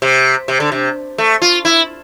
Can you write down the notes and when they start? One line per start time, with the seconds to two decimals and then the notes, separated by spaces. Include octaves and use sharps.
0.02 C3
0.48 C3
0.60 D3
0.72 C3
1.18 A3
1.42 F4
1.65 E4